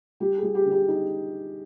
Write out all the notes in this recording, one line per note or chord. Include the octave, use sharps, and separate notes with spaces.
G3 G4
G#4
G3
G4
D3
G4
D#4